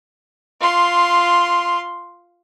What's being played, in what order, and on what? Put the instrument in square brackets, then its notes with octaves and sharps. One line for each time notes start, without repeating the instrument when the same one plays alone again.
[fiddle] F4 C6